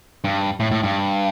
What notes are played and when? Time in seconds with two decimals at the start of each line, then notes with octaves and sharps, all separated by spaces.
0.24 G2
0.60 A2
0.71 A2
0.83 G2